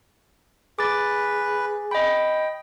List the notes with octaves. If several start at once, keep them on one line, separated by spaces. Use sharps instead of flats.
G#4 B4 D6 A6
D#5 G5 B5